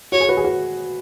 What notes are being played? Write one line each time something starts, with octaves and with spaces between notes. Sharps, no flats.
F#4 C#5
G#4
F#4 B4
G#4
F#4